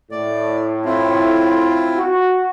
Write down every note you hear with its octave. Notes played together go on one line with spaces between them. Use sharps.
A2 D5
C4 E4 F4
F#4